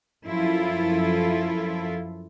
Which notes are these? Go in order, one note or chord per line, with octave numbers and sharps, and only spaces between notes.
F#2 F3 E4 F4 A4